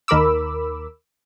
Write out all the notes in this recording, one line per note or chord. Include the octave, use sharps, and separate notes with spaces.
D#2 D#3 A#4 B5 D6 E6